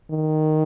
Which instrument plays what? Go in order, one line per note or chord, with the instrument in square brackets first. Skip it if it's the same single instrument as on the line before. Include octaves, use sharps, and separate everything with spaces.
[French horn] D#3